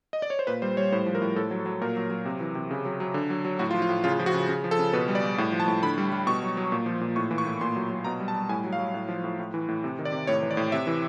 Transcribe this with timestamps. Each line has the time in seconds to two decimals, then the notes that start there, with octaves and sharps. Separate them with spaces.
0.13 D#5
0.22 D5
0.30 C#5
0.39 C5
0.47 A#2 B4
0.62 G3 C5
0.77 G3 C#5
0.92 A2 C5
1.06 F3
1.15 A#4
1.22 A2
1.36 A2 A4
1.51 F#3
1.59 A4
1.66 F#3
1.81 A#2 A#4
1.97 F#3
2.10 F#3
2.25 C3
2.40 E3
2.55 C3
2.71 C#3
2.85 F#3
3.00 F#3
3.14 D3
3.30 F#3
3.45 F#3
3.59 A2 F#4
3.71 F4
3.74 F3
3.82 F4
3.89 A2
4.04 C#3 F4
4.19 F3
4.26 F#4
4.34 C#3
4.48 C#3
4.64 F3
4.71 A4
4.79 C#3
4.93 B2 B4
5.08 G3
5.15 D5
5.23 G3
5.38 A2
5.52 F3
5.60 A5
5.68 A2
5.83 D3 B5
5.98 G3
6.12 G3
6.27 B2 C#6
6.42 F#3
6.57 F#3
6.72 A#2
6.86 F3
7.01 A#2
7.16 A2 C#6
7.31 E3
7.38 C#6
7.46 A2
7.61 A#2 C6
7.76 F#3
7.90 F#3
8.04 B2 A#5
8.20 G3
8.28 A5
8.35 G3
8.49 A2 G#5
8.64 F#3
8.73 F5
8.79 F#3
8.94 A2
9.08 F3
9.24 A2
9.39 A2
9.54 E3
9.69 A2
9.84 C3
9.99 D#3
10.05 D5
10.12 C3
10.27 A2 C#5
10.43 E3
10.51 D5
10.57 A2
10.72 C3 E5
10.87 E3